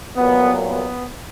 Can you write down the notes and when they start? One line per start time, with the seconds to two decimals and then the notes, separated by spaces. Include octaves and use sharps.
0.17 C2 A#2 F#3 B3
0.68 B3